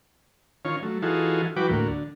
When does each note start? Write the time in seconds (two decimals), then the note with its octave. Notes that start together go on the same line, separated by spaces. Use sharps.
0.65 D#3 C#4 F4 C#5
0.83 F#3 A3
1.02 E3 D#4 F4 F#4 G#4 A4
1.56 E3 F#3 F#4 B4 G5 D6
1.69 D2 A2 A#3 F#4
1.88 D3